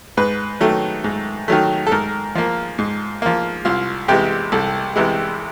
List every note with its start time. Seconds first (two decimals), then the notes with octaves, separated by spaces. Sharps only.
0.17 G#2 B4
0.61 D#3 F#3 A3
1.04 G#2
1.48 D#3 F#3 A3
1.87 A4
1.92 G#2 A#4
2.35 F3 A#3
2.78 G#2
3.22 F3 A#3
3.65 C2 F4
4.08 C3 E3 G#3 G4
4.52 C2 A4
4.96 C3 E3 G#3